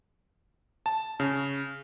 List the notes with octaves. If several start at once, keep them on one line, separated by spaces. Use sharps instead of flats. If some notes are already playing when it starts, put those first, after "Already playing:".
A5
C#3